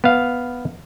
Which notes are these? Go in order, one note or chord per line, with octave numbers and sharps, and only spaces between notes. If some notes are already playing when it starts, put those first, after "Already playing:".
B3 F5